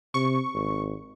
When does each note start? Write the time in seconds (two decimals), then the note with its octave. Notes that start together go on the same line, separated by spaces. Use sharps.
0.14 C3 C#6
0.55 G#1